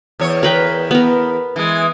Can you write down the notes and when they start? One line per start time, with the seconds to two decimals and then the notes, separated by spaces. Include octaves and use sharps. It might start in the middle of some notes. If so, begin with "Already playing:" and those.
0.20 E2 C#5
0.43 A#4 B4 G5
0.91 B3 A#4
1.56 E3 G#3